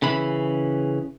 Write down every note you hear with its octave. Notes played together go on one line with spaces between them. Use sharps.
C#3 E3 B5